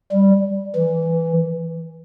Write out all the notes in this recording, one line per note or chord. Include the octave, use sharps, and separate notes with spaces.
G3
E3